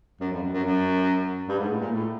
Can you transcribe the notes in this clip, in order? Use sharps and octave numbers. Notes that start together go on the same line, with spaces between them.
F#2
F2
F#2
F#2
F#2
G2
G#2
A2
A#2
A2